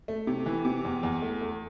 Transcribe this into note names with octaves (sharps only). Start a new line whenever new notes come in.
A3
C3
E3
C3
E2
E2
A3
A3